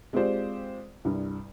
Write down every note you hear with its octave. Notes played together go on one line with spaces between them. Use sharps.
G#3 C4 F4 G4 C5 D5
C2 G2